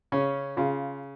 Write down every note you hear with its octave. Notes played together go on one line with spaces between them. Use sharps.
C#3 C#4
C#3 F4